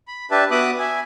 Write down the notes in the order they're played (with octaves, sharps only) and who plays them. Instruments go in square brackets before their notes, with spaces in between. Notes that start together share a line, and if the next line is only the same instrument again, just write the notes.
[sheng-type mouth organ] B5
D4 G4 B4 E5 A5
B3 F#4 E5 D6 D#6 F#6
E5 G#5